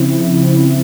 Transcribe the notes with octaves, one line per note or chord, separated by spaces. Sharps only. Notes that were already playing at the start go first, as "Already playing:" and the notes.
Already playing: C#3 F3 C4 E4